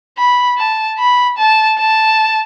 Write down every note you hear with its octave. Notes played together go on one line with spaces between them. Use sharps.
B5
A5
B5
A5
A5